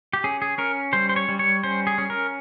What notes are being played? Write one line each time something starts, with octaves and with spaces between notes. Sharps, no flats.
G4
C#4 G#4
G#4
C#4 A#4
G3 C5
C5
C#5
G3
C#5
C#4 C5
G#4
C#4
A#4